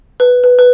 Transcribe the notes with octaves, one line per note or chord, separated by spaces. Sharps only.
B4
B4
B4